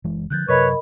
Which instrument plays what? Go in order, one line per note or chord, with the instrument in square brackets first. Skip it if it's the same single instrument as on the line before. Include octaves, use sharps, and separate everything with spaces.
[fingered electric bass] F#1 E3 G#3
[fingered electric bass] D3 D#3 F3 [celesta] F#6 G6 A6
[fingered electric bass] F#2 C3 F#3 [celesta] A#4 D#5 B5 [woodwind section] B4 C#5